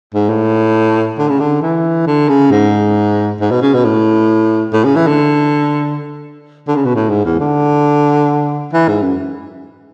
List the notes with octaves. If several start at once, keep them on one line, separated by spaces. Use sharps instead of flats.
G#2
A2
D3
C#3
D3
E3
D3
C#3
G#2
G#2
B2
C#3
B2
A2
A2
C#3
E3
D3
D3
C#3
B2
A2
G#2
E2
D3
E3
G#2
F#2